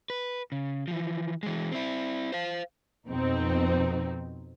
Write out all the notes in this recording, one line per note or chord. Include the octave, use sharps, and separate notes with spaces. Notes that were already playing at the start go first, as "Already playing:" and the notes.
B4
C#3
E3 F3
E3 G#3
C4 E4
C5 F5
F2 B2 C4 D#4